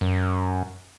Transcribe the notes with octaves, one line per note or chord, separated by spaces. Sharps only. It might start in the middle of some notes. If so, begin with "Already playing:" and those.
F#2